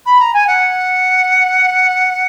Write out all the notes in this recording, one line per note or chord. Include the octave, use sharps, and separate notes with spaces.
B5
A#5
G#5
F#5